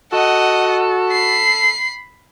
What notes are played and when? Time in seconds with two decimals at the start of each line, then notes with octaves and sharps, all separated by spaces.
0.13 F#4 A4 D#5 F#5
1.11 B5 C7